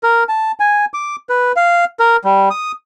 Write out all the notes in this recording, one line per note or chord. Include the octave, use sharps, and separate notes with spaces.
A#4
A5
G#5
D6
B4
F5
A#4
G3
D#6